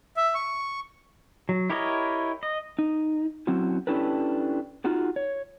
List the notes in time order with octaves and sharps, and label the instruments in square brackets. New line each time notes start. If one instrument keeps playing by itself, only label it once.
[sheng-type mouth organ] E5
C#6
[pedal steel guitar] F#3
E4 G4 A#4 C#5 D#5
D#5
[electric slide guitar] D#4
F#3 C4 C#4 E4 F#4
C#4 D4 E4 G4 A4 B4
D#4 F4 F#4 G#4
C#5